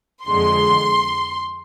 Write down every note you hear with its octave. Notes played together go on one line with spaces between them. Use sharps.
F2 D3 F3 G#3 C6